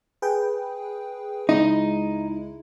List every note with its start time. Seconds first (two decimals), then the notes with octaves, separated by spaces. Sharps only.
0.22 G#4 B4 G5
1.49 C#2 G#3 D#4 E4